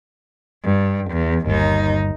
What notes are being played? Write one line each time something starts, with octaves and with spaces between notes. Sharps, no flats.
G2
E2
G1 D#2 G3 D#4